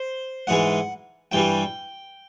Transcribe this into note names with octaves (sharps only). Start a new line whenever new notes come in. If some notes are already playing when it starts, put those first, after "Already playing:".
Already playing: C5
G#2 E3 G#3 F#5
G2 E3 G3 G5